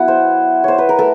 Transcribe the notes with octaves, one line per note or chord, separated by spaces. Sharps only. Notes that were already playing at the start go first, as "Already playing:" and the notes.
Already playing: F#3 B3 E4 F#5
C5
C5 C#5
B4
A#4
A3 A4